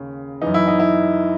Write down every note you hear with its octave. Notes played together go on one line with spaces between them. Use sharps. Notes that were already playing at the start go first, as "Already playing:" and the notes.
Already playing: D#2 C#3
F#2 E3 D#4
E4
D#4
E4